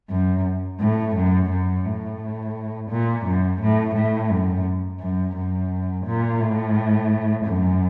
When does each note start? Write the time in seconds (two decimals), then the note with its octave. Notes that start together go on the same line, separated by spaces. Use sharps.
0.10 F#2
0.80 A2
1.16 F#2
1.50 F#2
1.85 A2
2.90 A#2
3.25 F#2
3.61 A2
3.95 A2
4.30 F#2
5.00 F#2
5.36 F#2
6.06 A#2
6.41 A2
7.45 F#2